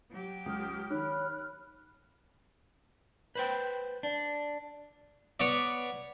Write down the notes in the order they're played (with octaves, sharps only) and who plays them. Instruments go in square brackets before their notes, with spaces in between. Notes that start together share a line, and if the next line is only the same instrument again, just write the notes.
[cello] F#3 G4
[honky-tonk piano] C#2 [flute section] D#6 F6
[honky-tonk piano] D#3 [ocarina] C#5 [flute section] B5 F6 F#6
[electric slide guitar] B4 C5 G5
D4
[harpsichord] B3 C#5 D5